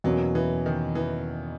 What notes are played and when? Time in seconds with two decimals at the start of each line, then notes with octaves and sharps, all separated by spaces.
0.04 E2 B2 F#3 A#3 C#4
0.35 E3
0.66 D#3
0.95 E3